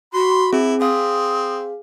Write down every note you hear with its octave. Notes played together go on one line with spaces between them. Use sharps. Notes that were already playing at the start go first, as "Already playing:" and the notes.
F#4 B5 C6
C4 E4 G#4
C4 G#4 F5 D#6